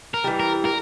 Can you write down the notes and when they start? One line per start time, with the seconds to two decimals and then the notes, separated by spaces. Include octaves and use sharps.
0.14 A#4
0.24 E3 G3
0.40 A#4
0.65 A#4